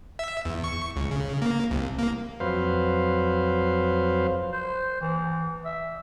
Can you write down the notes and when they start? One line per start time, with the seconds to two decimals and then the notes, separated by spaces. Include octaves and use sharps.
0.19 E5
0.45 E2
0.64 C#6
0.96 C#2
1.11 C#3
1.42 A#3
1.71 C2
1.99 A#3
2.40 F2 F#3 B4 C5 F5
4.53 C5
5.01 E3
5.65 E5